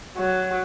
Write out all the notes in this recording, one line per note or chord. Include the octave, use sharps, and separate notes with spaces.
F#3